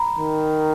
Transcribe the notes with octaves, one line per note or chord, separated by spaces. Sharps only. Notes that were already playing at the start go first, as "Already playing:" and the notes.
Already playing: A#5 B5
D#3